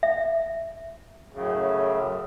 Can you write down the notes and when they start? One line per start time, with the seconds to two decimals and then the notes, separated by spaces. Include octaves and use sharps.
0.03 E5
1.33 F#2 A2 C#3